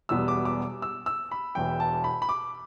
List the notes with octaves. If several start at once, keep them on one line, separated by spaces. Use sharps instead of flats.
E1 E2 B2 G3 B3 E6
D6
D6
E6
E6
B5
E1 E2 E3 G5
A5
B5
B5
D6